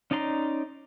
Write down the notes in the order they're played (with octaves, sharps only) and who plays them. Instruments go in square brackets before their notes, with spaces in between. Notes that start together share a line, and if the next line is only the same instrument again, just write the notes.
[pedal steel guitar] C#4 D#4 D5 A#5 C6